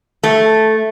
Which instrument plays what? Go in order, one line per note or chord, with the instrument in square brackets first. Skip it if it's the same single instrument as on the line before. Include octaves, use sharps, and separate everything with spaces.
[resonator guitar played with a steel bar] A3